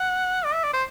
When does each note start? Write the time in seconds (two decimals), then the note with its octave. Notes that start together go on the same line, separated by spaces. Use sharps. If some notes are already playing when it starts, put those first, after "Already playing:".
Already playing: F#5
0.45 D5
0.54 E5
0.64 D5
0.73 C5